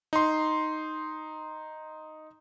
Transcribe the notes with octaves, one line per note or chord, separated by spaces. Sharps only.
D#4 C6